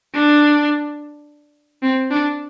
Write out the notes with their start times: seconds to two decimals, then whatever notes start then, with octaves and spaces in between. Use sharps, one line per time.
0.14 D4
1.83 C4
2.11 D4